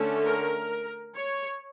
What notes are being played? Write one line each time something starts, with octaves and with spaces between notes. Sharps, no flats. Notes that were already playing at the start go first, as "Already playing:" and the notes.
Already playing: D3 A3 C#4
A#4
C#5